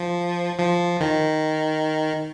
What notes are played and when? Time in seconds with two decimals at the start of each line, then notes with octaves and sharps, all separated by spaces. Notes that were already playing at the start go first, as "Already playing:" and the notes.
Already playing: F3
0.59 F3
1.00 D#3